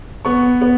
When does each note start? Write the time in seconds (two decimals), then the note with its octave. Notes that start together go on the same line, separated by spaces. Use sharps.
0.25 B3 C#6
0.61 B3